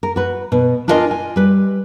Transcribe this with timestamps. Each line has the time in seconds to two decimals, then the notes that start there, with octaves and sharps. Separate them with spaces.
0.03 A#4
0.16 F#4 B4
0.52 B2
0.88 D4 E4 F4 A#4 D#5 G#5
1.11 G#5
1.36 G3 B4